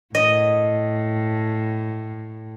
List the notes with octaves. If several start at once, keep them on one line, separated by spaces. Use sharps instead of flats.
A2 D#5